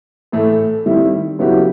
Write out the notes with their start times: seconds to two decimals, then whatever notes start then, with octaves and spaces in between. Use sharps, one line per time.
0.32 A2 E3 A3
0.86 D#3 G3 C4 E4
1.39 C#3 F#3 B3 E4 G4